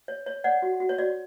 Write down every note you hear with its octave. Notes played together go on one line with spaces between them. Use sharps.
C#5
C#5
C#5 D5 F#5
F#4
F#4
C#5
F#4 D5